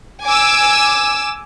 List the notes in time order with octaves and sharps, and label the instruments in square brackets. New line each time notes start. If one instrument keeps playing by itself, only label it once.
[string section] G#5 D6 E6